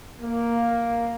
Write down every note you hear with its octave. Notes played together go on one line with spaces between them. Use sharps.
A#3